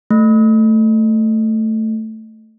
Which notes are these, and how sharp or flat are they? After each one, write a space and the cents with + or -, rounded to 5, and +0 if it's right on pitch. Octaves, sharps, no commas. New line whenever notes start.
A3 +5